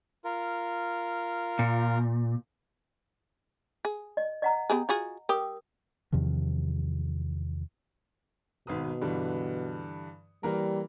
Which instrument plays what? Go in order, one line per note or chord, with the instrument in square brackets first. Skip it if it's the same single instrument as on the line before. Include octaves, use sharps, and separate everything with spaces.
[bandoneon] F4 A#4
[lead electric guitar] A#2
[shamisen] G#4
[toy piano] D#5
D#5 F#5 A#5
[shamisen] B3 G4 G#4
F4 F#4 G#4
[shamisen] G4 [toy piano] A#4 D#6
[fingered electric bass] E2 C3 D#3 F3
[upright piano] G#1 B4 D#6 [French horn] B2
[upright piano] G2 D3 E3
[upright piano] E3 A#3 A#4 [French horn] G3